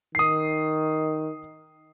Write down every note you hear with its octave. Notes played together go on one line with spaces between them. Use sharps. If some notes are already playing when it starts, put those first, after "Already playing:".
D#3 D#6 C7